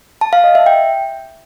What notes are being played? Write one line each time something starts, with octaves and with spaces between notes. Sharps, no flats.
A5
F5
D#5
E5
G5